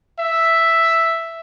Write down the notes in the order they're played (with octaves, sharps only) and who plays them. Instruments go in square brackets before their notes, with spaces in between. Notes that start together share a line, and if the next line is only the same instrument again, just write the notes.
[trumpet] E5